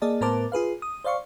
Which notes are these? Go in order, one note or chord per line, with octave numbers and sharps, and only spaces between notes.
A#3 G#4 D5 D#5 A5
A2 B3 A#4 C5 A5 D6
F4 G#4 B4 F5
D#6
C5 D5 F5 C6 C#6